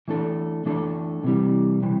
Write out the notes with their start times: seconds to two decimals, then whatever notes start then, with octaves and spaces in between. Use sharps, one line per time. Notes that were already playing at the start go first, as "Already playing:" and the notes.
0.08 E3 A3 D4 A4
0.66 E3 A3 D4 A4
1.24 C3 E3 G3
1.82 C3 E3 G3